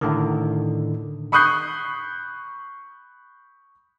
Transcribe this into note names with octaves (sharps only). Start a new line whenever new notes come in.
A2 D3 D#3
B5 C#6 D#6 F#6 G6 C7